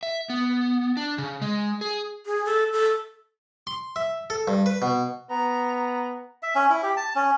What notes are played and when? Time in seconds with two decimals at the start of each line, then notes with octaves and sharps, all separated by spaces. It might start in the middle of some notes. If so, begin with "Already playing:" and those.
0.03 E5
0.30 B3
0.97 D4
1.18 C#3
1.42 G#3
1.81 G#4
2.26 G#4
2.45 A4
2.73 A4
3.67 C6
3.96 E5
4.30 A4
4.47 G2
4.66 B4
4.82 B2
5.31 B3 A#5
6.43 E5
6.55 C#4
6.70 E4
6.83 G4
6.97 A5
7.15 C#4